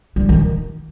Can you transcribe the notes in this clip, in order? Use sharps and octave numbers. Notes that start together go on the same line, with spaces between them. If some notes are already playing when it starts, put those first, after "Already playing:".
G3
D#3